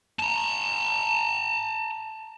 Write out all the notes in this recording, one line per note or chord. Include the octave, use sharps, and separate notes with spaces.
A5 A#5